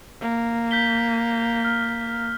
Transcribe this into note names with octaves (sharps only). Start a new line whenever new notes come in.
A#3
G6 B6 G7
F6